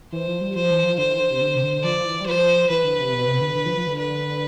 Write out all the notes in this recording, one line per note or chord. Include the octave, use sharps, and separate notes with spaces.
E3 C5
F3
G3
F3 C5
E3
F3
D3 C5
E3
D3
C3
D3
C3
D3
F3 D5
E3
G3
F3 C5
E3 B4
D3
C3
B2
C3
D3
D3
F3
F3
D3
B4